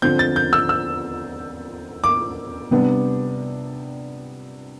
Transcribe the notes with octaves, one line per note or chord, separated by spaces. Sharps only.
D3 F3 C4 G6
A6
G6
E6
E6
D6
C3 G3 B3 D4